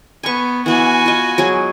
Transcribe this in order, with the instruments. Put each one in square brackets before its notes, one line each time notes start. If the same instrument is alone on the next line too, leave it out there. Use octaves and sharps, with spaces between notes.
[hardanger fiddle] B3 [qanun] G#5 C#6
[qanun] E3 B3 [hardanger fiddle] F#4 G#5
[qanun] F4 D#5
F#3 G#3 G#4